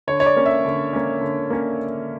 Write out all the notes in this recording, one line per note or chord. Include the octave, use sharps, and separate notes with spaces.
D3 C#5
C#5
D5
A#3 C#4
E5
D3
A#3 C#4
D3
A#3 C#4